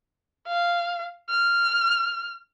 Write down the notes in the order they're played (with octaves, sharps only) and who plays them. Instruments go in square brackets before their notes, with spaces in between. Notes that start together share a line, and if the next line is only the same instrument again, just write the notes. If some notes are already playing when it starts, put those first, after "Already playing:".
[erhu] F5
F6